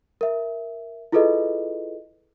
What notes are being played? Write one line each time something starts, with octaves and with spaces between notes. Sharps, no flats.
A#4 E5
E4 F4 G#4 A4 B4 D#5